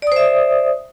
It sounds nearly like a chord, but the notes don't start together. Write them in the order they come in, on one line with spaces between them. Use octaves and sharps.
D5 D#6 C5 E5